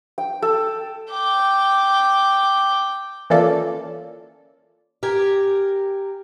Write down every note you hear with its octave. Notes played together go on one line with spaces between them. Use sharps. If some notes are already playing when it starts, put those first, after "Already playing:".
G5
A4
G5 D6
E3 A#3 C#4 F4 A4 D5
G4 A#4 G#5